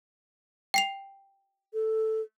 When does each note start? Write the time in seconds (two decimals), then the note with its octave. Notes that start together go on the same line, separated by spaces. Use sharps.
0.74 G5 C7 F7
1.74 A4